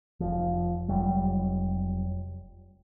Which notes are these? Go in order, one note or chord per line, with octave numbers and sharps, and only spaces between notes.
F1 F3
F1 F#3 G3